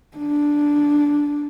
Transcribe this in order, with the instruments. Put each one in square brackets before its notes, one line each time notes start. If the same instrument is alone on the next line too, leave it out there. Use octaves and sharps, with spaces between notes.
[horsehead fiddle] D4